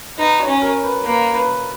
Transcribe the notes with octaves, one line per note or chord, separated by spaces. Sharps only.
D#4 B4
C#5
C#4
A#4
B4
A#3 B4
B4